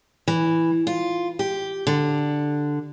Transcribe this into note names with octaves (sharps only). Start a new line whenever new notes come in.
E3
F4
G4
D3